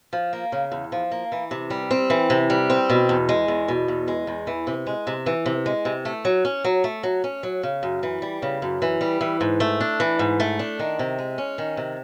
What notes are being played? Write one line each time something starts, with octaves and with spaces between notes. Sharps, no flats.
F3
A#3
C#3
E2
F3
A#3
E3
C3
G3
C4
E3
C3
G3
C4
B2
E2
G#3
E2
B2
E2
G#3
E2
E3
C3
G#3
C3
E3
C3
G#3
C3
A3
F#3
C#4
F#3
A3
F#3
C#4
F#3
C#3
F#2
E3
G3
C#3
F#2
E3
G3
E3
G#2
A3
D4
E3
G#2
A3
D4
D#3
C3
G#3
C#4
D#3
C3